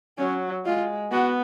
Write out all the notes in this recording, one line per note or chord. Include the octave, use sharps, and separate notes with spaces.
F#3 C#4
G#3 F4
B3 F#4